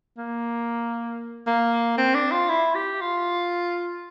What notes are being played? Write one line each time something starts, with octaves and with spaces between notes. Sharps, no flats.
A#3
A#3
C4
D4
F4
E4
G4
F4